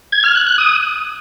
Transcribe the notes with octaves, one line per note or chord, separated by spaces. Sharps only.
G#6
F6
F#6
F#6
D#6